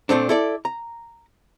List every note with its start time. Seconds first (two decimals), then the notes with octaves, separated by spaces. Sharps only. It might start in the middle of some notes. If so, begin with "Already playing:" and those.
0.09 A#2 A3 C4 D4
0.29 E4 A4 D5
0.65 A#5